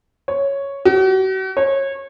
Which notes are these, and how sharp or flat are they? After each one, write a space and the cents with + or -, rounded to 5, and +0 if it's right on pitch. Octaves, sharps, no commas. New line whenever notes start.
C#5 +0
F#4 +40
C#5 -25